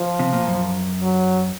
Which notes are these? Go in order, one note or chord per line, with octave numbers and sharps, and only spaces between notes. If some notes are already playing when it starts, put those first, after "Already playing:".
Already playing: F3
C3
A#2
F#2
F#3